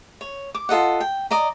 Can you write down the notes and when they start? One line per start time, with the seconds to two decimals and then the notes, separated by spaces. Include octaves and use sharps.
0.21 C#5
0.54 D6
0.69 F4 A4 D#5 F#5
1.00 G5
1.31 D5 D#5 A#5